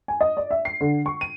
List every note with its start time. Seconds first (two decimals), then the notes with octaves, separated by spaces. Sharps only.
0.08 G#5
0.21 D#5
0.37 D5
0.51 E5
0.65 C7
0.81 D3
1.06 C#6
1.21 D#7